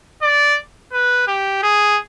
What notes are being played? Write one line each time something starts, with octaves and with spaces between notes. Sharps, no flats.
D5
B4
G4
G#4